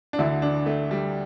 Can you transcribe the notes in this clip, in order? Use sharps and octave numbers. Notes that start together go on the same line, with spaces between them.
D4
D2 D3 E4
D4
A3
G3